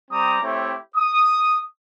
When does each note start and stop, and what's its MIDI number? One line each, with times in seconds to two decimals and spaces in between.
0.11 0.38 55
0.11 0.38 60
0.11 0.38 82
0.11 0.38 86
0.11 0.38 87
0.41 0.75 57
0.41 0.75 60
0.41 0.75 64
0.41 0.75 67
0.41 0.75 73
0.97 1.60 87